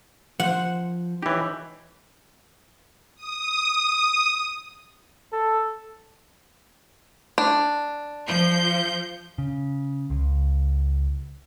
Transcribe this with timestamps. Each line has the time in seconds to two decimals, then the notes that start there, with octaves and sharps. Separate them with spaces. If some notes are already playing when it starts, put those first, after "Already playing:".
0.40 F3 C5 F#5
1.22 E3 D#4 G4 C#5
3.16 D#6
5.32 A4
7.38 D4
8.27 F3 G6
9.38 C#3
10.10 C#2